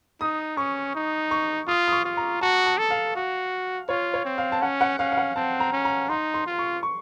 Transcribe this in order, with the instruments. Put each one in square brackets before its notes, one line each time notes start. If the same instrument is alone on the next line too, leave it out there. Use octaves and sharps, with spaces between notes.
[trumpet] D#4 [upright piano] D#6
[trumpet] C#4 [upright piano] C#6
[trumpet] D#4
[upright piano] C#6
[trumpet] F4 [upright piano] D#6
[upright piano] D#6
C#6
[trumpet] F4
[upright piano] A#5
[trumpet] F#4 [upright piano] A5
[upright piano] A5
[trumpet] A4
[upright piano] F5
[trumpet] F#4
[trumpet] F4 [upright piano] C#5
[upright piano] C#5
[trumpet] C4
[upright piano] F5
A5
[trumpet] C#4 [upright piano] F#5
[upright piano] F#5
[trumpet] C#4 [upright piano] F5
[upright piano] F5
F#5
[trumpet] C4 [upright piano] A5
[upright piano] A#5
[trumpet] C#4
[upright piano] A#5
[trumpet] D#4 [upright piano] C6
[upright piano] C6
[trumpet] F4
[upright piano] C#6
C#6